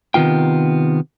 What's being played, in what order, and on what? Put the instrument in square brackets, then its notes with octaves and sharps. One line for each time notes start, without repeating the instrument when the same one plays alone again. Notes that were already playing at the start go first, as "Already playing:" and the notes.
[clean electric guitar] C3 D#3 B3 F4 G5